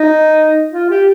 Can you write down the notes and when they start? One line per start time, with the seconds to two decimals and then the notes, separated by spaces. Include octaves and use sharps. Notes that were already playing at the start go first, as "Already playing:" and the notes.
Already playing: D#4
0.72 F4
0.90 G4